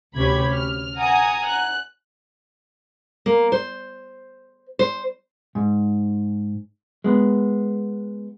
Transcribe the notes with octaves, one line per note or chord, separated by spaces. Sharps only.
D2 C3 C#4 G4 B5 G#6
F6
F#5 G#5 A#5 D#6
F#6
A#3
C5
C5
G#2
G#3 B3